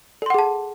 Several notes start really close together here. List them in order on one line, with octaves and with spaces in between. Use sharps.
A4 C6 F#5 G#4 A5